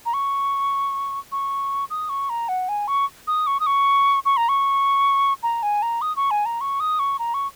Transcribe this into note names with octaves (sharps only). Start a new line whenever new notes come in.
A#5
C#6
C#6
D#6
C#6
A#5
F#5
G#5
C#6
D#6
C#6
D#6
C#6
C#6
A#5
C#6
A#5
G#5
A#5
D#6
C#6
G#5
A#5
C#6
D#6
C#6
A#5
C#6